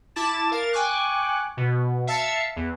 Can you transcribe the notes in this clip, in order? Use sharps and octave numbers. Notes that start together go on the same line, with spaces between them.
E4 A5 D6 A6 E7
A#4 F5 A6
G5 G#5 C#6 D6 F#6
B2
E5 F5 A5 E6 A6 C#7
E2